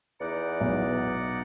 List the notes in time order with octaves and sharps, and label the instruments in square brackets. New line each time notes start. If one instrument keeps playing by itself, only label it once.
[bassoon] E2 [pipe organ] D#4 D5 F#5
[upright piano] B1